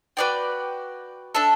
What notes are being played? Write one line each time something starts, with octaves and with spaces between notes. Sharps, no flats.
F#4 B4 D5 G5
D4 A4 E5